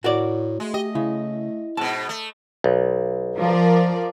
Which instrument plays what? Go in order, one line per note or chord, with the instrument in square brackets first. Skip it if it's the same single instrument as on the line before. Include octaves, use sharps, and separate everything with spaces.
[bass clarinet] A2 [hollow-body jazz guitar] F#4 A#4 D5
[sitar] G#3 [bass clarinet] A3
[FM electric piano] G4 [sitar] D#5
[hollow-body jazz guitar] C#3 [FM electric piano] E4
[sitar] G#2 B2 [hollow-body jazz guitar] A5
[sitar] A3
[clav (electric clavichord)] B1
[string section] F3 A#4 D5